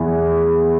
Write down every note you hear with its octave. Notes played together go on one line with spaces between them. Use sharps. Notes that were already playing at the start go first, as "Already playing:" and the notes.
Already playing: E2 E3